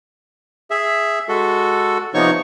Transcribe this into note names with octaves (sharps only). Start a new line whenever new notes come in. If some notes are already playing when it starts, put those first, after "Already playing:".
G#4 E5
G#3 F#4 A4
C3 F3 B3 D#4 C#5 C#6